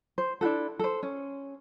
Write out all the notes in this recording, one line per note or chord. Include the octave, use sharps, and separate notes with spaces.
C5
D4 E4 F#4 A4
A4 C5
C#4